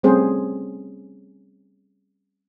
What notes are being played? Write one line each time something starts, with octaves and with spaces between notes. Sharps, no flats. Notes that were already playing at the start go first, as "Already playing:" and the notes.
G3 A3 C4 C#4 G#4 C5